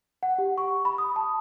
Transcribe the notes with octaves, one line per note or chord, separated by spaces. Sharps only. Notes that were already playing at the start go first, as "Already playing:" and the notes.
F#5
G4
C#6
B5
D#6
A5